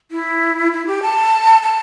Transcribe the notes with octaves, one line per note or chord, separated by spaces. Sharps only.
E4
E4
G4
A5
A5